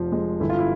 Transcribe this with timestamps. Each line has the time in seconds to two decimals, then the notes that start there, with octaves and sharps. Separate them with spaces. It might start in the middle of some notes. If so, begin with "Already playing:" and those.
Already playing: F1 F2 F3
0.12 G#3
0.40 G1 E4
0.50 F4
0.59 E4